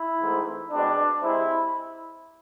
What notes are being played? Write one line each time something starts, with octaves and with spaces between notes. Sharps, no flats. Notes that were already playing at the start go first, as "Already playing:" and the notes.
Already playing: E4
G#2 E3 A3 C4
B2 G#3 C4 D4
C3 G#3 C4 E4